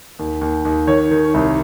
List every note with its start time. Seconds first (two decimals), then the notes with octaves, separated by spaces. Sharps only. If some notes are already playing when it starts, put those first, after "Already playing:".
0.19 D#2
0.41 D#2
0.65 D#2
0.87 D#3 C#5
1.11 D#3
1.34 C2